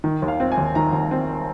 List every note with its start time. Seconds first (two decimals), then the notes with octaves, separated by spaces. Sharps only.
0.04 D#3
0.22 D#2
0.28 F5
0.40 C4
0.52 G#5
0.57 D#2
0.75 D#3 A#5
0.93 D#2
1.11 C4